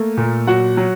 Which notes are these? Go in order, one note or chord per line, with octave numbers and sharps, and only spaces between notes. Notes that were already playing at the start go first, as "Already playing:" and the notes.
Already playing: A3 A#3
A#2
F#3 F#4 F#5
F#3